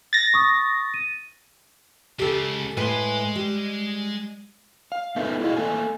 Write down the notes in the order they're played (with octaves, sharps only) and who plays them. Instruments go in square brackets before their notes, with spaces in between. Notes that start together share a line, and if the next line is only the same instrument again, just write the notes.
[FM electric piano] A6 A#6
[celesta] C#6 D#6
D#7
[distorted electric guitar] C#2 C#3 [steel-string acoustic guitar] G4 A4
[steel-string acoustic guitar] A2 B4 G#5 [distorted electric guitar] G#3 C6
[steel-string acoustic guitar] G3
[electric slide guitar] F5
A3 B3 D#4 A4 B4 E5
E4 F#4 G#4 D#5 F5
A3 A#3 A4 G#5